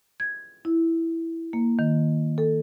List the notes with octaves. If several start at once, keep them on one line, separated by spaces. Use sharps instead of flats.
G#6
E4
A#3
D#3
A4